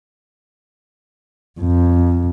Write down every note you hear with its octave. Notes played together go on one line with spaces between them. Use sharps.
F2